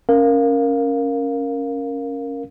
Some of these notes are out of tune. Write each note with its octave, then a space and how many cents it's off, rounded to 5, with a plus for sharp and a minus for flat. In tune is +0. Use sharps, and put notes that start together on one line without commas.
C#4 +0 A#4 +0 F5 +0